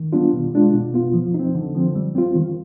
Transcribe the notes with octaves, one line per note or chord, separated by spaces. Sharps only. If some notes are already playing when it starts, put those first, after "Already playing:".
Already playing: D#3
G3 B3 D4 F4
B2
G#3 D4 F4
B2
B3 F4
F3
C4 D#4
D3
F3 C4
G3
C4 F4
D#3